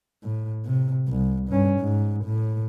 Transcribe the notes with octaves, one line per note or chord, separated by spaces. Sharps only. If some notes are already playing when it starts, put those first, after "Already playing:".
A2
C3
C2
G2 C#4
G#2
A2